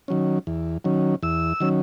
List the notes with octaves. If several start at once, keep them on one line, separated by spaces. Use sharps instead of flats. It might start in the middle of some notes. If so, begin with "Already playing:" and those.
D#3 F#3 C#4
E2
D#3 F#3 C#4
E2 E6
D#3 F#3 C#4